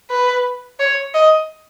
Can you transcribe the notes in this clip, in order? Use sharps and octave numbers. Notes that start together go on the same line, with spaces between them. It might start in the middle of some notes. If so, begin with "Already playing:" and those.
B4
C#5
D#5